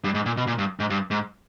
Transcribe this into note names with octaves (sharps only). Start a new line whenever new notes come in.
G2
G#2
A#2
B2
A#2
G2
G#2
G2
G#2